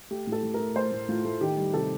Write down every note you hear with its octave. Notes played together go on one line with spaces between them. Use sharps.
A3 G4
A2
A4
A2
A#4
A3
A3 C5
A2
A2 F4
A3
D#3 G4
G3
C3 A4